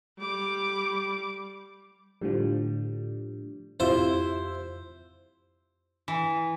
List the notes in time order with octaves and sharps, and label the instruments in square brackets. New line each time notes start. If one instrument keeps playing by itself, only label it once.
[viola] G3 D6
[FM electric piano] A2 D3 F3 [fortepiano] G3
[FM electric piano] F2 E6 [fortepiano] C3 E4 F4 [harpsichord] C5
[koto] E3